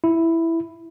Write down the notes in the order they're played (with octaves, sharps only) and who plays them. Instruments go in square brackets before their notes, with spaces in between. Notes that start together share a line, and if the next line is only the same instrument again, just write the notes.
[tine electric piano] E4